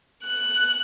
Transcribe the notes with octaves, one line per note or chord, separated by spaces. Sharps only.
F#6